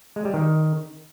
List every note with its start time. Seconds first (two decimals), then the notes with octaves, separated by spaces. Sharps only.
0.16 G#3
0.25 G3
0.34 D#3